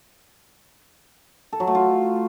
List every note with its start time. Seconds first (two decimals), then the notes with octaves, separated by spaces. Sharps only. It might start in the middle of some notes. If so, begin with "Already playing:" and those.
1.53 A4
1.60 F#3
1.67 A3
1.75 F4